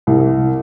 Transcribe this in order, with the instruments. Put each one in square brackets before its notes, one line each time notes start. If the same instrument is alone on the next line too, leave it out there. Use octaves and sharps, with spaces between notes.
[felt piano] C2